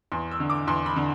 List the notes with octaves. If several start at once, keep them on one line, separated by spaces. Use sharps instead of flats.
E2 C6
E6
D3
D6
E2 C6
B5
D3